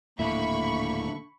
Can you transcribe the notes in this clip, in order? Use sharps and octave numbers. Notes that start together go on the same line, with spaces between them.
D#1 A2 D3 A#3 E5 B5 C#6